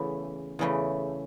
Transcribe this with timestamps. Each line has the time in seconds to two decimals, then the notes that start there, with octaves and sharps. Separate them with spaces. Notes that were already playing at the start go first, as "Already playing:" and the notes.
Already playing: E2 C#3 E3 A3
0.59 E2 C#3 E3 A3